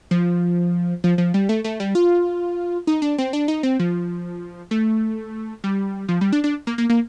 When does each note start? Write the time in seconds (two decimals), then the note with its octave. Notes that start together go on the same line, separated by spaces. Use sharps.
0.11 F3
1.04 F3
1.18 F3
1.34 G3
1.49 A3
1.64 A3
1.80 G3
1.95 F4
2.87 D#4
3.02 D4
3.18 C4
3.33 D4
3.48 D#4
3.63 C4
3.79 F3
4.71 A3
5.64 G3
6.08 F3
6.21 G3
6.32 D4
6.44 D4
6.67 A#3
6.78 A#3
6.89 A#3